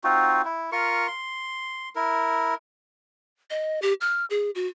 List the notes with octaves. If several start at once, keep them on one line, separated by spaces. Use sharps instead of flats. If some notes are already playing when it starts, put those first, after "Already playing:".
C4 D#4 F4 F#4
E4
F4 A#4 C#6
C6
E4 A#4
D#5
G4
F6
G#4
F#4